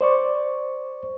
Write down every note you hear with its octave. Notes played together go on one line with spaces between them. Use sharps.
C5 D5 C#6